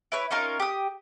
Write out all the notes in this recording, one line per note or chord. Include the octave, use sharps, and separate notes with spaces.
E4 B4 C#5
C#4 D#4 F4 A#4
G4 D#6